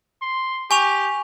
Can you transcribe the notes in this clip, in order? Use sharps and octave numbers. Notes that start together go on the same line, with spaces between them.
C6
G4 G#5 C#6 F7